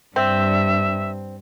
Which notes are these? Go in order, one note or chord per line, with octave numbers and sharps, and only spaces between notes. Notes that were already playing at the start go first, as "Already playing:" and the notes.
G2 C4 E5